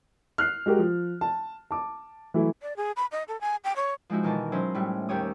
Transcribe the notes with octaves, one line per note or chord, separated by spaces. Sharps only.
F6 F#6 C7
G#3 F#4 G4 A#4
F3
A5
A5 D6
E3 F#3 A3 E4
D5
G#4
B5
D#5
A4
G#5
G5
C#5
F3 G#3 D#4 E4 F#4
B2 D#3 E3 A5
F#3 C#4 D#4 E4 C5
A2 G3 A3
D#2 G3 G4 C#5 D#6